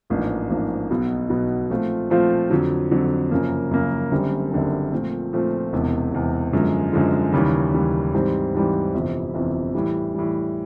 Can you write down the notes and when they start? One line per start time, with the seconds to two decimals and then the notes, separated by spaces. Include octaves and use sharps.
0.10 A1 G#2 F3 A#3 D4
0.50 A1 G#2 F3 A#3 D4
0.90 B1 B2 F#3 B3
1.30 B1 B2 F#3 B3
1.70 A#2 F3 A3 C4 F4
2.10 A#2 F3 A3 C4 F4
2.50 F2 D3 F#3
2.91 F2 D3 F#3
3.31 F#2 C#3 F3 A#3
3.71 F#2 C#3 F3 A#3
4.11 F#1 F#2 D3 G3 C4
4.52 F#1 F#2 D3 G3 C4
4.92 A#2 F3 A3 C4
5.33 A#2 F3 A3 C4
5.73 E1 E2 C3
6.13 E1 E2 C3
6.53 F#2 D3 F3 G#3
6.93 F#2 D3 F3 G#3
7.33 D#2 C#3 E3 G3
7.73 D#2 C#3 E3 G3
8.14 G#2 E3 G3 C4
8.54 G#2 E3 G3 C4
8.95 G1 F2 C3 E3
9.34 G1 F2 C3 E3
9.75 A2 E3 G3
10.14 A2 E3 G3